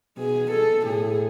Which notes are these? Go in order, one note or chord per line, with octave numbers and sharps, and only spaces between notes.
B2 G#4
A4
A2 G#4